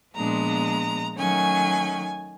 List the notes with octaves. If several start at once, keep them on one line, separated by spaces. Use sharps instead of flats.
A#2 F3 G#3 B3 D4 A#5
D#3 F#3 A3 C#4 G#5